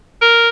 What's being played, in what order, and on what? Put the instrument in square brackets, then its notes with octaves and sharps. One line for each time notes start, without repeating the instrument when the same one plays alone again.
[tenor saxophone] A#4